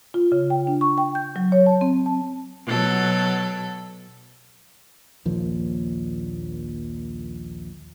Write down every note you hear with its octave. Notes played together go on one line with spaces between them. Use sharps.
F4
C#3
G5
D4
C#6
G5
G6
F#3
C#5
A5
C4
A5
B2 F#3 A4
A#1 D#2 F3 A#3